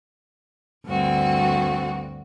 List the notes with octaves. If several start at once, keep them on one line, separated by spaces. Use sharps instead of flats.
D2 G2 C4 F#4